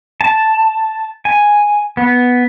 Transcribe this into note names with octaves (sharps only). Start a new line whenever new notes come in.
A5
G#5
B3